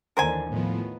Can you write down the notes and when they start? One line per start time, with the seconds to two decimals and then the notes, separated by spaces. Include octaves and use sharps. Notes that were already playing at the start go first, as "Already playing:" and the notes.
0.17 D#2 D3 E3 A#4 C5 G#5
0.51 A2 D#3 F3 B3